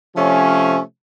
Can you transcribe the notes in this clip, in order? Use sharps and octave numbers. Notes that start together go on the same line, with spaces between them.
C3 F3 A3 C#4